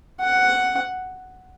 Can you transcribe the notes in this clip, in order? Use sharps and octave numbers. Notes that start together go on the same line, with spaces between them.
F#5